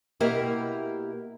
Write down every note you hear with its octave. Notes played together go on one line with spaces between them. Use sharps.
B2 A#3 E4 G4 A#4